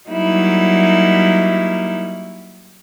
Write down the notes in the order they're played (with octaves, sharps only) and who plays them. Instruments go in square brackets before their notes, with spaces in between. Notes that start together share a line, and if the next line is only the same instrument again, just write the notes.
[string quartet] F#3 G3 A#3 D#4 E4